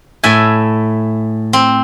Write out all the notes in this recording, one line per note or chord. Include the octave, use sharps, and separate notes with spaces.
A2 E5 G#5
C4